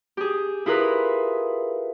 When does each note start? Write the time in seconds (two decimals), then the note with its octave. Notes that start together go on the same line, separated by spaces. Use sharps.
0.17 G4 G#4
0.66 E4 F4 G#4 A#4 B4